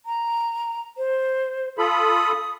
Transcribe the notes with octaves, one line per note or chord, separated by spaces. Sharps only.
A#5
C5
F4 A4 B5 D#6